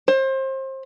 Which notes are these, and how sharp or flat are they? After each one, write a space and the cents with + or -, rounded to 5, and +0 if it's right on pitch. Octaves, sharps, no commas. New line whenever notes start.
C5 +30